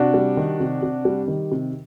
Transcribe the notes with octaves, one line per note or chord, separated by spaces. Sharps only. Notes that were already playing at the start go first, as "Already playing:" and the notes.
Already playing: C3 D4 F#4
G3
D#3
C3
C3
G3
D#3
C3